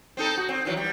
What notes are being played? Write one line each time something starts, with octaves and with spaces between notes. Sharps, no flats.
C4 D#4 A4
F#4
C4
D#3 E3 F#3
G3